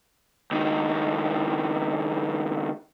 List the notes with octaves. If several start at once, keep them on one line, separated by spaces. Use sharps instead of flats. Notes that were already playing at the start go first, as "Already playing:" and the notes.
C#2 D#3